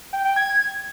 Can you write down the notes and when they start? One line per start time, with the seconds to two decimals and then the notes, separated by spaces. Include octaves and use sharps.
0.13 G5
0.25 G5
0.36 G#6